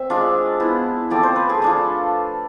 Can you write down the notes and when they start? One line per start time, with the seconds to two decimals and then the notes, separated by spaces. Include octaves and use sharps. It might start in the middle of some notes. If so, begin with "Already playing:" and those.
Already playing: C4 E5
0.10 G#3 D4 F4
0.60 B3 E4
1.10 F3 A3 C4 D5
1.23 C5
1.36 B4
1.49 G#4
1.62 A3 D4 F4 A4